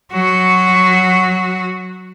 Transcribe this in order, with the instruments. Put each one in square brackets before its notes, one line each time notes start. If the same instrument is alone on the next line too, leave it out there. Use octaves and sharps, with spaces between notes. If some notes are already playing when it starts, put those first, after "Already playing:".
[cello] F#3 F#4